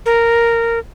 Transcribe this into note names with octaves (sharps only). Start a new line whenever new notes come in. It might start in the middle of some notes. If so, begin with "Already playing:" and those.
A#4